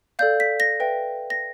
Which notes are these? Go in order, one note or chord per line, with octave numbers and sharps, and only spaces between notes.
A4 D5 F5 G6
B6
A#6
B4 E5 G5
A#6